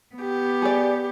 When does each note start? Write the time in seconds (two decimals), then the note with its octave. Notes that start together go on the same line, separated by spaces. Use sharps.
0.17 B3 G4
0.62 G#4 D5